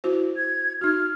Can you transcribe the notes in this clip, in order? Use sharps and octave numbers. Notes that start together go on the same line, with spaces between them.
E4 F#4 C5
G#6
D#4 F#4 F6